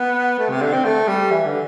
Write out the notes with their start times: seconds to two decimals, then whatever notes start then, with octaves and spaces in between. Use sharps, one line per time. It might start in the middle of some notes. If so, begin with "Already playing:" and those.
Already playing: B3
0.39 A3
0.50 C3
0.62 D3
0.73 C4
0.85 A3
1.08 G3
1.31 E3
1.46 D3